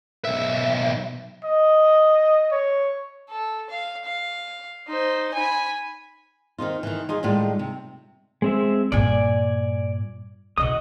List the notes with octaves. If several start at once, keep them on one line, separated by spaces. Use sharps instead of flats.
B1 E5
D#5
C#5
A4
F5
F5
D#4 C5
G#5 B5
D#3 C4 D#4 F4
D#3 E3
D#4 F4 G#4
A2 D#3 G3 G#3 F4
C3
G#3 C4 E5
G2 A#2 D5 G#5
E2 B2 F#4 D#5 D#6